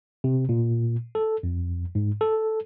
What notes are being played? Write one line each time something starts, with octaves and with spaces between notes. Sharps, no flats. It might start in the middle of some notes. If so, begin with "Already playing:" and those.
C3
A#2
A4
F2
G#2
A4